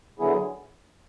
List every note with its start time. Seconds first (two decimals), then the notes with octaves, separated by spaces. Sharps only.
0.19 D3 F#3 B3 E4 G#4